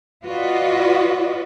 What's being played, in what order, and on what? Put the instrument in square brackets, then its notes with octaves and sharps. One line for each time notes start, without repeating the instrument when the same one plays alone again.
[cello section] F4 F#4 B4 D5 D#5